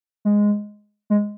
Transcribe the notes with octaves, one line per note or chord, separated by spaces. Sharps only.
G#3
G#3